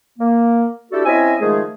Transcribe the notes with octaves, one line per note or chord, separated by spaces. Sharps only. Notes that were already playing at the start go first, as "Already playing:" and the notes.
A#3
D4 E4 F#4 G4 A4
C4 C#4 E4 D#5 E5 G#5
D#3 F3 G#3 A3 G#4